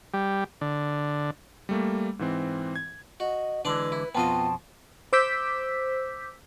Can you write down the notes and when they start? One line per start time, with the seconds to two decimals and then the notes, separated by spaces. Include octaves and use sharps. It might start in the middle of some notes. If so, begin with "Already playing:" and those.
0.14 G3
0.61 D3
1.69 G3 A3 A#3
2.19 G#2 E3 C4
2.76 G#6
3.20 F#4 D#5
3.65 D3 E3 G#3 D4 B4 D5
3.92 E4
4.15 F2 B2 B3 C4 F4 D#5 A5
5.13 C5 D6 E6 G6 B6